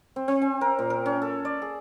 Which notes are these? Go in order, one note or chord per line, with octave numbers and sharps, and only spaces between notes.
C4
C4
G#5
A#4
A#2
A#4
C#4
A4
D5
G#4